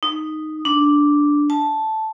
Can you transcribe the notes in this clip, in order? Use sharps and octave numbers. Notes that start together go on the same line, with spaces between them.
D#4
D4
A5